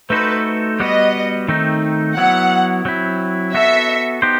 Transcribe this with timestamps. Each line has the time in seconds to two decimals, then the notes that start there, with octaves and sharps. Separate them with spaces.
0.10 A3 D#4 F#4 A4 B4 C5
0.80 G3 B3 F#4 B4 D#5
1.48 D#3 A3 C4 D#4
2.17 F#3 B3 E4 F#5
2.85 F#3 C4 E4
3.54 B3 F#4 A4 E5
4.22 B3 D#4 G4 C5